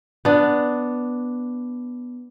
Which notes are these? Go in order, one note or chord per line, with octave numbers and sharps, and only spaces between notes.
B3 D4